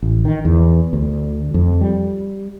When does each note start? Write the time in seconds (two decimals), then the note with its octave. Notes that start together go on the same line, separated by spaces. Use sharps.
0.02 A1
0.25 D#3
0.45 E2
0.93 D2
1.54 F2
1.81 G3